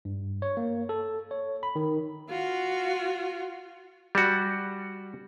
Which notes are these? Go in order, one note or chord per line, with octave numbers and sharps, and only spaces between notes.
G2
C#5
A#3
A4
C#5
B5
D#3
F4 F#4
G3 F#4